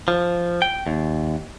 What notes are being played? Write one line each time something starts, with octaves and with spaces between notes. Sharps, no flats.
F3
G5
D#2